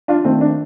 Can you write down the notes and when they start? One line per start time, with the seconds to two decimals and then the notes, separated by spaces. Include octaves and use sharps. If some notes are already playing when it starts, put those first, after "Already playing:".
0.08 D4 F4
0.24 D#3 A3 C4
0.41 D4